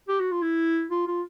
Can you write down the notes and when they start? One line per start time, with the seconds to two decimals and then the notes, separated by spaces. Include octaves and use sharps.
0.08 G4
0.20 F#4
0.32 F4
0.42 E4
0.90 F4
1.07 F4